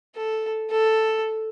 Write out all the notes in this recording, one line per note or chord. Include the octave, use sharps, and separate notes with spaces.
A4
A4